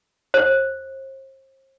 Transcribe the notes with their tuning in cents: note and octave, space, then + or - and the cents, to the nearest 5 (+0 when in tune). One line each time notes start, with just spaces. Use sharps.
C5 +35